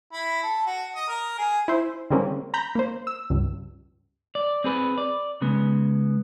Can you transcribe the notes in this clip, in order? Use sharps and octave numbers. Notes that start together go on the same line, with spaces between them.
E4
A4
F#4
D#5
A#4
G#4
E4 C5
D3 G3 G#3 A#3 C4 C#4
A#5 B5 G6
A#3 C5
E6
C#2 G2
D5
C4 G#4 B4
D5
C#3 G#3 B3